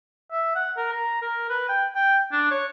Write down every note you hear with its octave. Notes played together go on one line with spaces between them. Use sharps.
E5
F#5
A#4
A#5
A#4
B4
G5
G5
D4
C#5